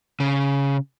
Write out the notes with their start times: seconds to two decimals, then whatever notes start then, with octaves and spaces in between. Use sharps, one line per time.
0.20 C#3